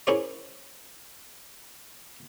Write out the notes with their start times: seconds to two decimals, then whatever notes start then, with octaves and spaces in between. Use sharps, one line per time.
0.07 C#4 E4 G#4 A#4 C5 D5